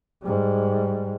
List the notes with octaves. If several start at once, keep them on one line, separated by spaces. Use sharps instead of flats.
G#2 G3